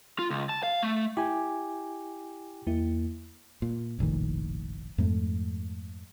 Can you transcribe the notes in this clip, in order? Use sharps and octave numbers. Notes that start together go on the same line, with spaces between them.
F4
C#2
A5
F5
A3
E4 G4 G#5
E2 A#3 E4
A#2
F1 A#1 A2 D#3
F2 G#2 A3